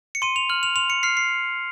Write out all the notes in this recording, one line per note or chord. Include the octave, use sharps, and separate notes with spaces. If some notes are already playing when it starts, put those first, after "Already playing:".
C#7
C6 D#7
F7
F6 F#7
F7
C6 F7
C#7
F6 C7
C7